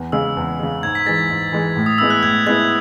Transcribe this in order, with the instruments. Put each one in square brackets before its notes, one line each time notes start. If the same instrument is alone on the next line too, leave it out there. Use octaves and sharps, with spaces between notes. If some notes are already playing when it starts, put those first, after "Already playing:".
Already playing: [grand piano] E2
[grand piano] C#3 G#3 [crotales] E6
[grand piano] E2
C#3 G#3
[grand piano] G#2 [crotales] G#6
[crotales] B6
[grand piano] E3 G#3 [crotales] A6
[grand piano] G#2
E3 G#3
A2
[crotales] D#6
[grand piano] G#3 B3 E4 [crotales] E6
[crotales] F#6
[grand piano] A2 [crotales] G#6
[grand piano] G#3 B3 E4 [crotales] G#6